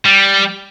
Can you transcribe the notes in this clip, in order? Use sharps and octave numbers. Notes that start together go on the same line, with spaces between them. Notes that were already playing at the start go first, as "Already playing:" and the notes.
G3